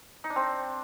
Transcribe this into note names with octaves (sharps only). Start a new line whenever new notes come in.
D#4
D4
C4